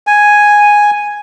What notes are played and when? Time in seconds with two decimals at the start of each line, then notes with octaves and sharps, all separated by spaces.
0.07 G#5